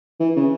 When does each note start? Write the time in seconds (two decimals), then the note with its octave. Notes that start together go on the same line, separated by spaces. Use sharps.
0.20 E3
0.36 C#3